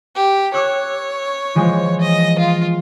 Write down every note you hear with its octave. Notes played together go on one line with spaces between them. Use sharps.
G4
C#5 D6 E6 F#6
E3 F3 G#3
D#5
F4